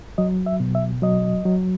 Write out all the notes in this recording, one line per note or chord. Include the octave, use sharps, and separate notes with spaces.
F#3 D#5
E5
B2
E5
F#3 D#5
F#3